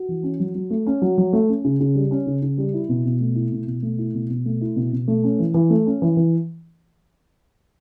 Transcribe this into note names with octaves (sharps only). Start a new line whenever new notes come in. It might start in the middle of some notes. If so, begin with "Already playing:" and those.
Already playing: F#4
E3
C#4
F#3
F#3
A3
C#4
F#3
F#3
A3
C#4
C#3
C#3
G3
C#4
C#3
C#3
G3
E4
B2
B2
A3
E4
B2
B2
A3
E4
B2
B2
A3
E4
B2
B2
A3
C#4
E3
E3
A3
C#4
E3
E3